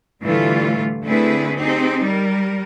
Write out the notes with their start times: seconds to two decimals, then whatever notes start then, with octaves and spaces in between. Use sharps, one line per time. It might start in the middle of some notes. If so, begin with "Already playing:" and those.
0.22 A2 D3 E3 G3 A3 F4
1.04 D3 A3 C4 E4 G#4 B4
1.56 C4 D#4 G4 G#4
2.04 G3 A#4